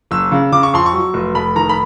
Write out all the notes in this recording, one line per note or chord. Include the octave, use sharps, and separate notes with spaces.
F#1 E6
C#3
C#3 D6
C#6
F2 C6
C#6
F#3
F1
F1 B5
D#3 A#5
B5